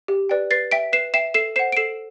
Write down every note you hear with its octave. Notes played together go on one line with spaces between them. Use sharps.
G4
B4 D5 G5
B4 A6 C7
E5 G5 B6 D7
B4 C7 E7
E5 G5 C7 E7
A4 C7 E7
C5 F#5 C7 E7
D7
A4 C7 E7